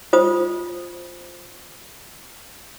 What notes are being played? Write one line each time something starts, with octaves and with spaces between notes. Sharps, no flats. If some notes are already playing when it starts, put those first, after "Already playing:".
F4 C5 D#6